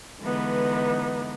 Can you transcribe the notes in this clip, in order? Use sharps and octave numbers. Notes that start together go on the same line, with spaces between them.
D3 E3 G#3 B3 D#4 B4